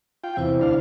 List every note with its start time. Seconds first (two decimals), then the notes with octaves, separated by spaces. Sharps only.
0.24 F4 G5
0.37 E2 C3 E4 C5
0.61 D2 D4 F5